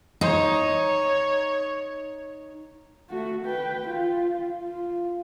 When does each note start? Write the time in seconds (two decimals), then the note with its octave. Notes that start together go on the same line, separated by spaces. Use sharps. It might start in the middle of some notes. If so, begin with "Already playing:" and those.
0.21 D#4 C#5
3.09 A3 F#4
3.45 B4 G5
3.85 F4
4.63 F4